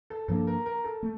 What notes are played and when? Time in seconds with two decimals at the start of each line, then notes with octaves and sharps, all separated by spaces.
0.10 A4
0.28 G2 F3 A#3 D4 A4
0.47 A#4
0.66 A#4
0.84 A4
1.03 A3